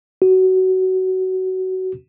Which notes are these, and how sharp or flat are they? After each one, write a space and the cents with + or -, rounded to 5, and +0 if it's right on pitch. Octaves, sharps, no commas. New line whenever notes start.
F#4 +20